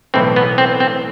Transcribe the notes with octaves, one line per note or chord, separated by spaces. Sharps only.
B1 A2 E3 C4
B3
C4
C4